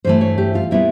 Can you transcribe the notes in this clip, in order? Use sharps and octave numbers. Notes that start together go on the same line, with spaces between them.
G2 E3 A3 C5
C#5
G4
F4
A#2 G3 B3 E4